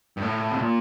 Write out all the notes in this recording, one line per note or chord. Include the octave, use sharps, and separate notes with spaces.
G2
A2
C3
A#2